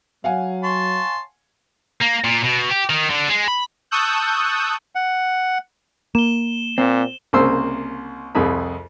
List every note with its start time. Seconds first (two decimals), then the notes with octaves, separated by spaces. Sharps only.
0.24 F#3 F5 F#5 G#5
0.64 C#5 A5 C6
2.02 A#3
2.25 A#2
2.44 B2
2.70 G4
2.90 D#3
3.10 D3
3.29 G#3
3.48 B5
3.91 A5 C#6 D#6 E6 F#6 G6
4.95 F#5
6.15 A#3 E7 G7
6.78 A#2 C4
7.33 C2 C#3 A#3 C5 E6
8.35 C2 F2 G#4 B5